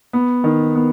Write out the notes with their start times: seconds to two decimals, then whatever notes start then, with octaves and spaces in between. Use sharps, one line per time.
0.13 B3
0.44 D#3
0.75 B3